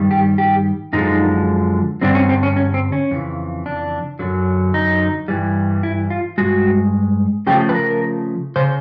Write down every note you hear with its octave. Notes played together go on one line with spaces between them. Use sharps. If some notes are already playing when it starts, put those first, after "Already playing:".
Already playing: G2 D#3 G3
G4
G4
F#2 D3 F3 G#3 D#4
G2 D3 G3 C4 D4
C#4
C4
C#4
C#4
C4
C#4
F2 C#3 E3
D4
F#2 D3 F#3
D#4
G2 E3 G3
E4
F4
G2 D#3 G#3 F#4
C#3 F3 A3 G4
B4
A#4
C#3 C5